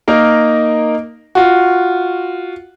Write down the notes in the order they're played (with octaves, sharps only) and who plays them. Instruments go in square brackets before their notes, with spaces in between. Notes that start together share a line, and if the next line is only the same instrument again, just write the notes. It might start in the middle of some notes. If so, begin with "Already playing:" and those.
[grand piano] A#3 D#4 A#4
F4 F#4